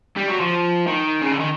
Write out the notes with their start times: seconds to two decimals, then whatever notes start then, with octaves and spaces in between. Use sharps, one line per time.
0.17 G3
0.28 F#3
0.40 F3
0.87 D#3
1.22 C#3
1.31 D3
1.40 D#3